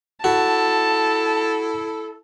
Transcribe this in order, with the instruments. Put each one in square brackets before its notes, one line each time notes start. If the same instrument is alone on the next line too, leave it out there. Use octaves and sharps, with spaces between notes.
[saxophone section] E4 A4 [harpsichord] F#4 [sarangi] A5